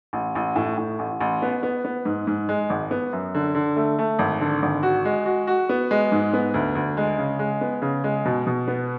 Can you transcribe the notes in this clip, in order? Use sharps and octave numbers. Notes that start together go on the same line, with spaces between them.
A1
A1
A2
A2
A1
A1
B3
B3
B3
G#2
G#2
G#3
G#1
B3
F#2
D3
D3
A3
A3
G#1
D3
G#1
F#4
G#3
F#4
F#4
B3
G#3
G#2
B3
D2
D2
G#3
C#3
G#3
B3
C#3
G#3
B2
B2
B3